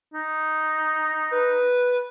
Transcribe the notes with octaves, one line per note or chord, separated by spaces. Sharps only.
D#4
B4